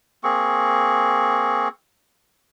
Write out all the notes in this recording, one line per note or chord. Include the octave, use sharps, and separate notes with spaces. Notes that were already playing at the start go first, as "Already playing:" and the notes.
A#3 C4 G#4 C#6